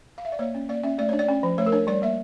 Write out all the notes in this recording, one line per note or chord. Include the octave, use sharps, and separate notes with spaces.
F5
E5
D5
A#3 C#5
C#4
A#3 D5
C#4 E5
A3 D5
D4 C#5
D5
C#4
F3
A3 C#5
A#4
D4 C#5
G3 D5
A#3 E5